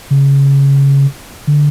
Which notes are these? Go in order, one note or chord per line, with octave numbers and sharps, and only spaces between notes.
C#3
D3